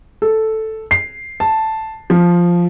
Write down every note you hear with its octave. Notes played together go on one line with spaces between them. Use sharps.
A4
C7
A5
F3